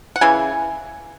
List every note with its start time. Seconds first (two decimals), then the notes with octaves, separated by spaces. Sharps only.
0.16 F#5
0.21 C#3 E3 G#5